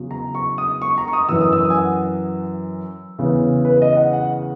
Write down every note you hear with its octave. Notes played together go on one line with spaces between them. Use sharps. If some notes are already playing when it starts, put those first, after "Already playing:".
Already playing: E2 C#3 F#3
A#5
C#6
D#6
C#6
A#5
C#6
D#6
F#2 E3 E6
D#6
E6
D#6
G#5
F#5
E2 C#3 E3
B4
D#5
F#5
F#5